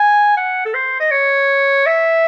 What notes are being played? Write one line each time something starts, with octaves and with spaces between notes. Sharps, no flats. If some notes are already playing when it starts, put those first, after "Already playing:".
Already playing: G#5
F#5
A4
C5
D#5
C#5
E5